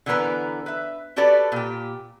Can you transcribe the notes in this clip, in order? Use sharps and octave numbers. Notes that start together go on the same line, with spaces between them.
D3 E3 B3 A#4 B4
B4 E5
F#4 G4 A4 B4 D5
A#2 G4